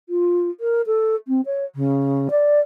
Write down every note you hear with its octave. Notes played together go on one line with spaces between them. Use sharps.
F4
A#4
A4
C4
C#5
C#3
D5